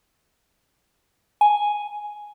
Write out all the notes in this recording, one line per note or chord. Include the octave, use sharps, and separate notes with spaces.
G#5